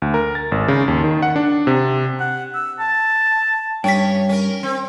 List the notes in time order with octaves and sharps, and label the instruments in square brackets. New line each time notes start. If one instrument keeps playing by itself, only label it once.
[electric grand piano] D2
A#4
A6
G#1
C#3
D#2
D#3
F#5
D4
C3
[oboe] F#5
E6
A5
[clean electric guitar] G2 [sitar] C#4 C#5 [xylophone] G5 B6
[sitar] C#4 A#4
C4